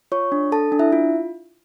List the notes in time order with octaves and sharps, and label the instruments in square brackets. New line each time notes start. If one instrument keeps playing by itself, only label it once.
[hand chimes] F4 C#5 C#6
D4
A4 A5
D4
E4 E5
F4